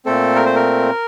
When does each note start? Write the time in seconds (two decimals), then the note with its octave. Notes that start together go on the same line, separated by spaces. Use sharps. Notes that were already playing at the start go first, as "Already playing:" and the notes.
0.06 A#2 A3 C4 A4
0.35 A#4
0.46 C5
0.55 A#4